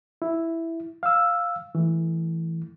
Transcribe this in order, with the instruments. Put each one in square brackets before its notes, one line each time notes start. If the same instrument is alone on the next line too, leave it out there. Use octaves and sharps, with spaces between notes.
[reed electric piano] E4
F5 E6
E3 A3